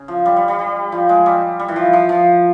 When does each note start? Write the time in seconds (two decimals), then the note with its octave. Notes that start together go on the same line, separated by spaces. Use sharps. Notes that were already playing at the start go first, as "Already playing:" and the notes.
Already playing: C#3
0.08 F3
0.26 G3
0.37 G3
0.48 G3
0.59 G3
0.92 F3
1.09 G#3
1.26 G3
1.59 G3
1.68 E3
1.76 F3
1.93 F3
2.09 F3